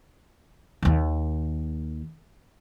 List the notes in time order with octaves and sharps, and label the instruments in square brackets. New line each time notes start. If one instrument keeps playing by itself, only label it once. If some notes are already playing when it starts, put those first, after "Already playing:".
[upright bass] D#2 D#3